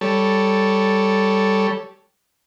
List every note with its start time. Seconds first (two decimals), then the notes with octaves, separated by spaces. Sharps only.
0.01 G3 A4 C#5